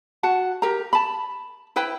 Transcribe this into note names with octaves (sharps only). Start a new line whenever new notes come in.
F#4 F#5 A5
G4 A#4 A#5
A5 B5
E4 B4 G5 B5